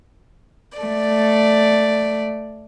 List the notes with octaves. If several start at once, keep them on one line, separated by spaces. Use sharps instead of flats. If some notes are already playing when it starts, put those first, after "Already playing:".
A3 D5